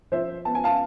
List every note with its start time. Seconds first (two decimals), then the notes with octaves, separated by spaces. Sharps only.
0.12 F3 C5 E5
0.45 B3 A5
0.55 G#5
0.64 F5 A5